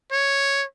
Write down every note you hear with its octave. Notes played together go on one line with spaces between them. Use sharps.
C#5